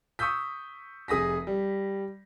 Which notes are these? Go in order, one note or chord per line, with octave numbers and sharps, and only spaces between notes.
C#6 D#6 E6 G6 B6
F1 G#4 D#6 A#6 B6
G3